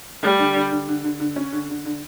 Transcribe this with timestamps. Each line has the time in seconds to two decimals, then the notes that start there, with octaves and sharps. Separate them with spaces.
0.23 G3 A3
0.39 D3
0.55 D3
0.72 D3
0.89 D3
1.04 D3
1.20 D3
1.36 C#4
1.53 D3
1.70 D3
1.85 D3